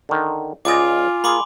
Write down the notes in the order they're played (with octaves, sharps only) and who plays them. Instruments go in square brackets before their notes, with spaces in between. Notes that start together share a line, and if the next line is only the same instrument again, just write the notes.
[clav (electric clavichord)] D3 D#3
[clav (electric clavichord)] C#2 D5 D#5 [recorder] F4 [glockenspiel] G#5 D6
[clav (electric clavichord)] A#3 G#4 [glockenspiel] B5 C6 D6